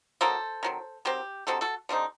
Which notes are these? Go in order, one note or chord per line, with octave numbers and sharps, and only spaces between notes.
F#3 A#3 D#4 A4 C5
D#3 F#3 C4
D#3 F#3 C4 G4
D3 G3 C4 D#4 F#4 A4
F#4 A4
D3 G3 C4 D#4